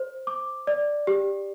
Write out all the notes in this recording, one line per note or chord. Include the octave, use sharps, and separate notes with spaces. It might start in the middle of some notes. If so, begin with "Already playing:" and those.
Already playing: C5
D6
D5
G4